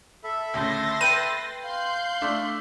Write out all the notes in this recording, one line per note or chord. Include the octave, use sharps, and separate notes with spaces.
A4 E5 B5
D2 A2 C#3 C6 A6 A#6
B4 G5 D#7
F5 C6 F#6 G6
A3 D4